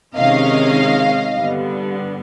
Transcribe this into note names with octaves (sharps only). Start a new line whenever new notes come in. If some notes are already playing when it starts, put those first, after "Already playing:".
C3 D#3 G#3 C#4 D#5 F5
G2 D3 G3 B3